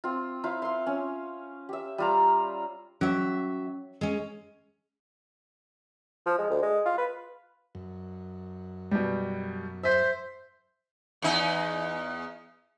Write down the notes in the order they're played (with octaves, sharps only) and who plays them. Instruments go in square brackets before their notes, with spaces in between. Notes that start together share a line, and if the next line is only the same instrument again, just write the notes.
[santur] C4 F4
E4 F4 C5 F5
F5 C6
C#4
G4 E5
G3 F4 A#5
[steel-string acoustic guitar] F#3 E5 [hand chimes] C#4
[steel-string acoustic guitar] G#3 C#4
[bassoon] F3
G#3
D2
G#3
F4
B4
[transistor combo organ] F#2
[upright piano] B2 G3
[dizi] C5 [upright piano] E5 B6
[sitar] E2 D#4